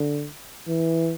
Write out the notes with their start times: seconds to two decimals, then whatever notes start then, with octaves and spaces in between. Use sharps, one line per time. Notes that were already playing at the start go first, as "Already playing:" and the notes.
Already playing: D3
0.68 E3